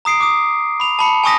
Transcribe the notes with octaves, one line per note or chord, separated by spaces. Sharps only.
A#5 D#6 C7 D7
D6 D#6
B5 F7
A5 B5 C#7
G#5 A5 C#6 D#6 A#6 B6